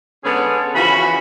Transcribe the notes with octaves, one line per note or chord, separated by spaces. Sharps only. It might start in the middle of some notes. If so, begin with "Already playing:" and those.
D3 G#3 B3 C#4 G#4 A4
C#3 E3 F3 F#4 B5